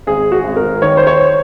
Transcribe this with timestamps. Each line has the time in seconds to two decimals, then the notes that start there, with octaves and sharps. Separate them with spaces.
0.07 G#1 G#4
0.32 F#4
0.44 G#1
0.56 A#4
0.81 D#3 C#5
0.97 C5
1.07 C#5